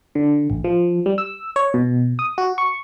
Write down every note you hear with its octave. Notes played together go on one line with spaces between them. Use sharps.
D3
A1
F3
G3
E6
C#5
B2
D#6
F#4
C#6